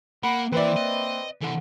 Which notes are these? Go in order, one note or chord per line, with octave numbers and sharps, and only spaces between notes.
A#3 F#5 B5
E3 A#3 C4 B4 C5 D5 E5
D#5
C3 E3 A4 F#5